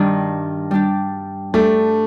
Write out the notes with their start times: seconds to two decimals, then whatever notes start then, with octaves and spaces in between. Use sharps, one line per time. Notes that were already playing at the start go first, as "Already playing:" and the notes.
Already playing: G2 D#3 G3 D4
0.71 G3 D4 G4
1.54 G3 A3 D4 G4